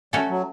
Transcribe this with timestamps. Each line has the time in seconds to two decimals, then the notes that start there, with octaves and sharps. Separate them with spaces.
0.13 G3 A3 C#4 F#4 A4 C#5
0.29 F#3